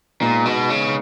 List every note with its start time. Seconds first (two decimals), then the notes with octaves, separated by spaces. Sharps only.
0.21 A#2 G#3 B3 D#4
0.45 B2
0.70 C#3